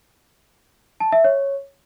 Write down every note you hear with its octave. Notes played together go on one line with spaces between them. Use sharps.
A5
E5
C#5